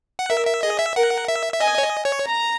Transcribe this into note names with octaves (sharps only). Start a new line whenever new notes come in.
F#5
A#4 E5
E5
G#4 D#5
E5
A#4 F#5
E5
E5
D#5 G#5
C#5
D#5
C#5
A#5